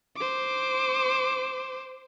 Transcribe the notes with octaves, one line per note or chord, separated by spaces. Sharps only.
C5 D6